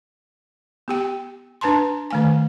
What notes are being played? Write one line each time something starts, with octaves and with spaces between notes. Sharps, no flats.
B3 G4 G5
D4 B4 A5 A#5 C6
D#3 A3 G#5